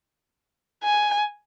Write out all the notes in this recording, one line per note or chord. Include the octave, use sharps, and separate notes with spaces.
G#5